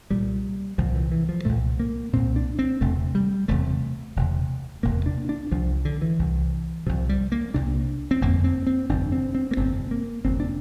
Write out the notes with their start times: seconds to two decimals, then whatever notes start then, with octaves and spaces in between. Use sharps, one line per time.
0.10 C2 A#2 G3
0.78 C2 A#2 F3
0.95 E3
1.12 E3
1.29 F3
1.45 C2 A#2 A3
1.80 A#3
2.13 C2 A#2 C4
2.36 D4
2.59 C4
2.81 E1 D2 C3 A3
3.15 G3
3.48 E1 D2 C3 A3
4.16 E1 D2 C3
4.83 E1 D2 C3 A#3
5.06 D4
5.29 D4
5.51 C2 C3 F3
5.85 D3
6.01 E3
6.19 C2 C3
6.87 C2 C3 F3
7.09 G3
7.32 A#3
7.54 C2 C3 D4
8.11 C4
8.21 G1 F2 C3 A#3
8.44 C4
8.67 C4
8.89 G1 F2 C3 D4
9.12 C4
9.35 C4
9.51 A#3
9.57 G1 F2 C3 C4
9.91 A#3
10.24 G1 F2 C3 C4
10.40 D4